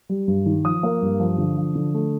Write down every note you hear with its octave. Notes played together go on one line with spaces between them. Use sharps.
G3
G2
D#3
F3 D#6
A#3
G2
F3
D3
F3
D3
A3